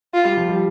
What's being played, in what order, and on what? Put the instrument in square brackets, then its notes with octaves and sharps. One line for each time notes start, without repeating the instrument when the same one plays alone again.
[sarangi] F4
[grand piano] G3
F3
G3